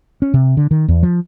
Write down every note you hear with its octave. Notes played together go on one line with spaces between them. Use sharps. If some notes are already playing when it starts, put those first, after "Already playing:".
C#4
C3
D3
D#3
E2
F3